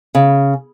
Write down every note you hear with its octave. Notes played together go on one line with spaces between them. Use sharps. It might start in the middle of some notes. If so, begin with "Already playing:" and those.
C#3